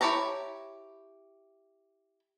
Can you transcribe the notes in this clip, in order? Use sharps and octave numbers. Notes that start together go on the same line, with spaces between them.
E4 G4 C#5 A5 A#5